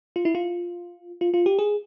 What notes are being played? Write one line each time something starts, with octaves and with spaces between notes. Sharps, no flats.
F4
E4
F4
F4
F4
G4
G#4